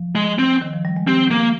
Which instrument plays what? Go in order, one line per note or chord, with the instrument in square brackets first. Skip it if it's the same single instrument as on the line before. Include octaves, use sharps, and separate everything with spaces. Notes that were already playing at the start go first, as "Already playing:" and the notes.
Already playing: [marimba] F3
[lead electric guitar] G#3
C4
[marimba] D#3
F3
G3
G#3
[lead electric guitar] C4 [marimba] G4
[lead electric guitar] A#3